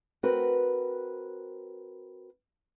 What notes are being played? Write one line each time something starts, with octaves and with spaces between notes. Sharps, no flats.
C4 F#4 A#4 B4